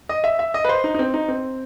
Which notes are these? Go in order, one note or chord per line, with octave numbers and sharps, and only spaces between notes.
D#5
E5
E5
D#5
B4
C5
D#4
D#4
C4
D#4
C4